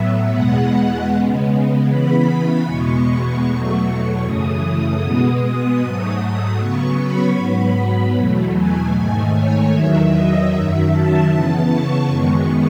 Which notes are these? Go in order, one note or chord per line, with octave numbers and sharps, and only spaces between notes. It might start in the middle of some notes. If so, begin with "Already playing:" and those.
Already playing: A2 F#3 B3 E5
E2 B2 G#3 B3 F#5
C#3 G#3 B3
C#3 E3 B3 B5
E2 B2 G#3 B3 C#6
E2 B2 F#3 A3 C#6
F#2 C#3 E3 A3 D#6
B2 G#3 B3 D#6
D#6
G#2 F#3 A3 D#6
C#3 F#3 B3 C#6
B5
G#2 F#3 B3
E2 B2 F#3 A3
G#5
G#2 D#3 A3
C#5
E2 D#3 F#3 E5
D#5
F#2 D#3 F#3 E5
A5
C#3 E3 B3
C#6
F#2 D#3 G#3 B3